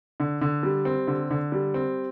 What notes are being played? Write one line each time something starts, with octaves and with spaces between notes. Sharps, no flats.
D3
D3
G3
C4
D3
D3
G3
C4